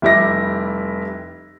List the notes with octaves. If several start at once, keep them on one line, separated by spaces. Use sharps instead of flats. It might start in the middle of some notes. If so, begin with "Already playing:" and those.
F1 G3 E4 D6 A#6